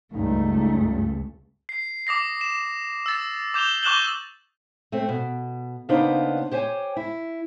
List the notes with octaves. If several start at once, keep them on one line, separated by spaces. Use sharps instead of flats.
C#2 G2 A3 D#4
C7
D6 D#6 A#6 C7
E7
E6 A6
D6 G6 E7 F7 G7
C#6 D6 F#6 E7 F#7 G7
A3 C4
B2
C#3 A#3 B3 D4 D#4 C5
G4 C5 C#5 E5 G#5
E4